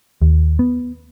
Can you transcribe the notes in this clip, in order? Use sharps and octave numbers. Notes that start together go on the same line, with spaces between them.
D#2
B3